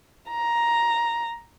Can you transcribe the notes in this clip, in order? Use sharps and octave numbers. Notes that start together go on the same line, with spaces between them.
A#5